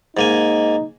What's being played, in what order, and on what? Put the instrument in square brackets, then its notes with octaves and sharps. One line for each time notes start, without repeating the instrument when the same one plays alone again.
[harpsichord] G#2 A#3 G#5 [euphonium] D#4